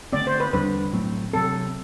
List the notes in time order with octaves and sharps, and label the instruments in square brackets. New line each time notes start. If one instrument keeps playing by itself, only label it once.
[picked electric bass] D3 A3 C4 [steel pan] D5
[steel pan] C5
B4
[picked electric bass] E2 D3 G3 D4 [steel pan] B4
[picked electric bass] A2 F#3 A3 C4
[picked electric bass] C3 F#3 C4 [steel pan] A4